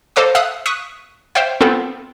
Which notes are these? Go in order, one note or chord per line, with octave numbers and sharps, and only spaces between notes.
A4 C5 D#5 F5 C6 D6
E5 F5 D#6 E6 F#6
C#6 D#6 F#6 B6 D#7
C5 C#5 E5 F5 G5
B3 C4 F4 A4